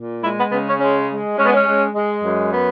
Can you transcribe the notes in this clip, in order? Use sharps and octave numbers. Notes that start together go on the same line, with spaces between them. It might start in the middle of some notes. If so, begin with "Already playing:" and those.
Already playing: A#2
G#3 E4
B3
C#3 B3
C#4
G#3 C#4
G#3
G#3 C#4
B3
C#4
G#3
G#3
F#2
B3